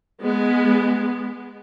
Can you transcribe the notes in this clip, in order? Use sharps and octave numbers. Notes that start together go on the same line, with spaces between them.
G#3 B3